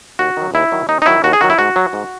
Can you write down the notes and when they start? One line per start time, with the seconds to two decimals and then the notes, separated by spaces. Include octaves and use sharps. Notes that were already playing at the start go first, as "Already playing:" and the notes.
0.19 D#2 F#4
0.37 D#3 F#3
0.54 D#2 E4
0.72 D#3 F#3
0.89 D#2 D#4
1.02 D#4
1.06 D#3 F#3 E4
1.24 D#2 F#4
1.33 G#4
1.41 D#3 F#3 F#4
1.50 E4
1.59 G#2 F#4
1.76 F#3
1.93 G#2